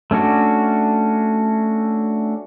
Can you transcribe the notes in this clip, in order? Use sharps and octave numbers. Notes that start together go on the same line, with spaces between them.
A3 C#4 D4 F#4